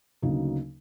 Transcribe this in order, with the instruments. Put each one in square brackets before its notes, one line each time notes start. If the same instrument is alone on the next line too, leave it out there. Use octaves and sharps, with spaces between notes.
[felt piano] D2 C#3 F#3 A#3 D#4